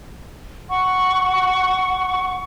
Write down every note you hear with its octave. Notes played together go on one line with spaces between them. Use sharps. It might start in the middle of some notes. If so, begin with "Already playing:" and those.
F#5 C#6